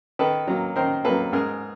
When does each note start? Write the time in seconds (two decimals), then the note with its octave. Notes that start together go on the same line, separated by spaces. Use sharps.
0.19 D#3 A4 B4
0.47 F#3 A#3
0.76 D#3 A#4 C5
1.04 F#3 A#3 A4 B4
1.33 G#2 G#4 A#4